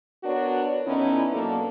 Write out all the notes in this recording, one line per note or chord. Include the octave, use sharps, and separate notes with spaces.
B3 D4 F#4 A#4 C#5
D3 B3 C#4 D#4 E4
B2 F#3 A#3 D4 F#4 A4